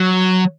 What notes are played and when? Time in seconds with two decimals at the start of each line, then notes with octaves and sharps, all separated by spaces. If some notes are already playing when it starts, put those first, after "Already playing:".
Already playing: F#3